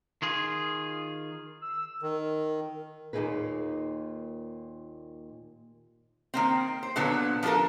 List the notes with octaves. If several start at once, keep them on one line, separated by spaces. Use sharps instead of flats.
D#3 F4 G#4
E6
D#3
D#2 A#2 E3 D#4 G#4 B4
D#3 A#3 C4
C5
A#2 D3 F#3 B3
F3 D4 F4 A4 A#4